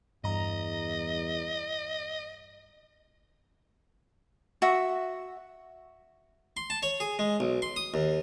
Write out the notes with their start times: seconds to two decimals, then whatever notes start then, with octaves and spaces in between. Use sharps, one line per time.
0.24 E2 G2 D#5 A#5
4.62 F#4 E5
6.57 C6
6.70 A5
6.83 C#5
7.00 G#4
7.19 G#3
7.40 B1
7.62 C6
7.76 D#6
7.94 D#2